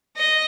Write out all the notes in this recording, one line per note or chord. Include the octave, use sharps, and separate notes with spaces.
D#5